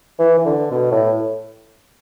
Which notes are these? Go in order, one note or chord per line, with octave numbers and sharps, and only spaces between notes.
E3
E3
D3
B2
A2